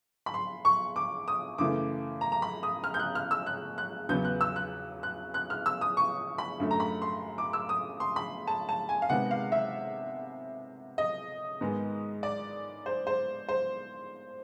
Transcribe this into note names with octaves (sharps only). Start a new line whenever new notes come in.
B5
C6
C#6
D6
D#6
F#2 C#3 E3 A3 D6
A#5
A#5
B5
D#6
F6
G6
F#6
F6
E6
F#6
F#6
E2 C#3 F#3 B3 G6
F#6
E6
F#6
F#6
F#6
F6
E6
D#6
C#6
B5
F#2 D3 F#3 A3
A#5
B5
C6
D6
E6
D#6
C6
B5
A5
A5
G#5
F5
C3 D#3 G#3 B3 F#5
F5
E5
D#5
G#2 D#3 G#3 B3
D5
C5
C5
C5